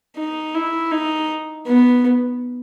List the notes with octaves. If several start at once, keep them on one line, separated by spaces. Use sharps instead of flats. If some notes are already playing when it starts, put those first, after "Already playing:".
D#4
E4
D#4
B3